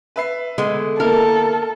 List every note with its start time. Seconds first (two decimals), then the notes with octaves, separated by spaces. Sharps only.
0.16 B4 E5 C7
0.58 D3 G#3 B3
1.00 A#3 E4 A4 A#4